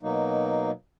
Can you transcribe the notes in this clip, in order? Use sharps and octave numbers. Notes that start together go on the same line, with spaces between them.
B2 F#3 A#3 D#4